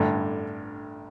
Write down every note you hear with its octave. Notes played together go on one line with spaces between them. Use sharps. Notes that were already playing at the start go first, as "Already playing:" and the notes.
Already playing: A1 G2 D3